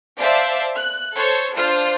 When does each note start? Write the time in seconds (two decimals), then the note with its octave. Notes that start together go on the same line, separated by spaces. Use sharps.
0.18 C5 D5 E5 F5 A5
0.76 F#6
1.13 A4 C5 C#5
1.54 D4 F4 C5 F6